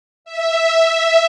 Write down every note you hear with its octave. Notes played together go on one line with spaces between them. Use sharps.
E5